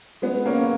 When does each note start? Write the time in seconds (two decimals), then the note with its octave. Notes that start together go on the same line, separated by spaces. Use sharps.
0.22 G#3 B3
0.46 A#3 C#4